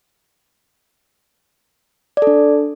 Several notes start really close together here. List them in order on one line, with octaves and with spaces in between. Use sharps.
D5 A4 D4